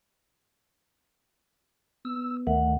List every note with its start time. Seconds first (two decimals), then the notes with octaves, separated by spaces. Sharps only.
2.05 B3 E6
2.47 D2 D#3 A3 F#5